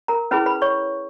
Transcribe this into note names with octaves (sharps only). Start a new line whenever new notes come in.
A#4 A#5
C#4 E4 G#4 B4 B5
B4 B5
C#5 C#6